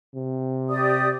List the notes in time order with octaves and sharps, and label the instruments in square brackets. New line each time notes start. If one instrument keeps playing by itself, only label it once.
[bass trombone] C3
[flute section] G4 D5 D#6